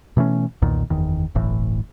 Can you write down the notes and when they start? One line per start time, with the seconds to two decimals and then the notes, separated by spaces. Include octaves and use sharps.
0.17 B2 E3 A3 C#4
0.62 B1 E2 A#2 D#3
0.90 F#1 E2 D#3
1.35 D1 G1 A2 E3